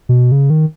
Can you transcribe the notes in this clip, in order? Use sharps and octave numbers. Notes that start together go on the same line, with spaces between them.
B2
C#3
D#3